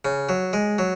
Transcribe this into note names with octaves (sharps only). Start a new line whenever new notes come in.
C#3
F#3
G#3
F#3